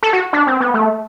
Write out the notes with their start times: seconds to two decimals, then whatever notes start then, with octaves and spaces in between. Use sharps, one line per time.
0.03 A4
0.13 F#4
0.33 D4
0.47 C4
0.60 B3
0.74 A3